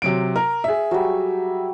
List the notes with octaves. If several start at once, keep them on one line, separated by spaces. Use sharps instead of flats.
C3 F#3 D7
A#4
G#4 E5
F#3 G3